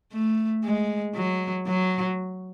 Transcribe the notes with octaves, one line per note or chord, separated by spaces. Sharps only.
A3
G#3
F#3
F#3